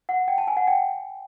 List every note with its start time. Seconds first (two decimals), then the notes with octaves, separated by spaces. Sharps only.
0.09 F#5
0.28 G5
0.38 A5
0.47 G#5
0.57 F#5
0.67 G5